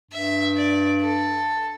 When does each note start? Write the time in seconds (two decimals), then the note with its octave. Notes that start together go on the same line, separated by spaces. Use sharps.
0.11 G2 E5
0.57 D5
1.01 A4